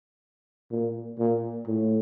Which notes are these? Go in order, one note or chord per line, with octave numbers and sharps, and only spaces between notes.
A#2
A#2
A2